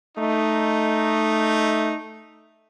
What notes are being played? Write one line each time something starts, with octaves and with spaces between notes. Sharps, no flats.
A3 D#4